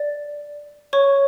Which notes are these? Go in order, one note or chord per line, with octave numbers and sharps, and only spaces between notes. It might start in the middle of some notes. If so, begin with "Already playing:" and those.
Already playing: D5
C#5 C#6